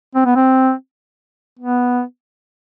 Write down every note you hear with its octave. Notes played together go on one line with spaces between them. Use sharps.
C4
B3
C4
B3